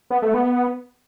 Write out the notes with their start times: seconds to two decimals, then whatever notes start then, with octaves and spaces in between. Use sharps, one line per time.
0.10 B3
0.22 A3
0.34 B3